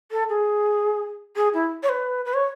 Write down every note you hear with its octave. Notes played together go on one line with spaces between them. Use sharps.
A4
G#4
G#4
E4
C#5
B4
B4
C#5